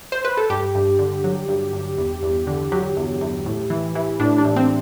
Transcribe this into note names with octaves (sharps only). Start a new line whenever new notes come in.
C5
B4
A4
G2 G4
G2
D3
F#3
G2
G2
E2
E2
D3
F#3 G4
E2
E2
A2
E3
E3
A2 D4
D4
A2
C4